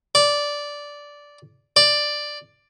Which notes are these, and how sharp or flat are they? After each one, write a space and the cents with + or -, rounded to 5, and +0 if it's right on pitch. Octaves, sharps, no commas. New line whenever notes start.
D5 -10
D5 +5